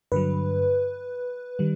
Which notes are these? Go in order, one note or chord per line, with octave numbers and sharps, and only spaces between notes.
G2 D3 F#3 B4
D#3 G3